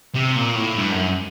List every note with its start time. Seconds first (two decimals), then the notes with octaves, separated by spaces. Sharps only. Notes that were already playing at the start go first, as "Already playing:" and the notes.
0.15 C3
0.36 A#2
0.56 A2
0.77 G2
0.93 F#2